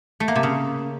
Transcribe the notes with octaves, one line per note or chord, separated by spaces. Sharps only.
A3
A#3
C3
C#3